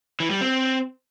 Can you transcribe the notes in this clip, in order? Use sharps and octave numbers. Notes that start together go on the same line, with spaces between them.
E3
G3
C4